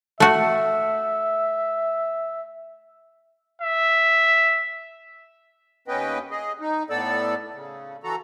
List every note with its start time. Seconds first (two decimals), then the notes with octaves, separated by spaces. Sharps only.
0.20 A3 F#4 E5
3.62 E5
5.88 D#2 B3 C#4 B4 D#5 G5
6.31 G#4 D#5
6.60 D#4
6.90 A2 B3 A4 D5 E6
7.54 C#3
8.04 E3 F#4 A4 A#5